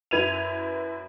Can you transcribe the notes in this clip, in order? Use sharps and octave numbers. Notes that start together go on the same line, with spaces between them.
F#2 E4 B4 G#6 D#7 F7